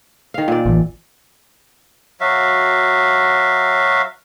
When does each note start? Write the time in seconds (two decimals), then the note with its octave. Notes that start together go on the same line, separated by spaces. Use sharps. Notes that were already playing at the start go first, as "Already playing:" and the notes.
0.34 D#3 F5
0.48 A#2 D5
0.66 A1 A2 E3
2.21 F#3 F#4 E5 F5